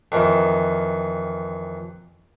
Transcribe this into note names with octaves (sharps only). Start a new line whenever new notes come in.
F2 D#3 E3